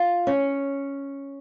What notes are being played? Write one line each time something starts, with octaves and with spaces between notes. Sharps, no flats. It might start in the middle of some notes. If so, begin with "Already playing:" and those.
Already playing: F4
C#4